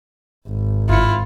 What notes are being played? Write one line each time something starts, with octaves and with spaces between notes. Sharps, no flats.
G#1
G1 E4 F4 C#7